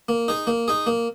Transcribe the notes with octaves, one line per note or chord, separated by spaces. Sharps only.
A#3
D#4 G#4
A#3
D#4 G#4
A#3